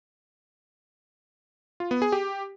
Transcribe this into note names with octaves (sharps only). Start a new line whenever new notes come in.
F4
B3
G#4
G4